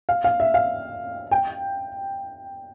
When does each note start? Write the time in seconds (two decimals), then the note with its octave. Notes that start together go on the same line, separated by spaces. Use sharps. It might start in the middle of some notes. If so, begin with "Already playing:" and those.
0.09 F5
0.24 F5
0.40 E5
0.54 F5
1.31 G5